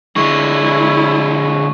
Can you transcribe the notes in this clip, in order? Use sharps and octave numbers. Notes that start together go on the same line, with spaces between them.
D3 G#3 E4 C#6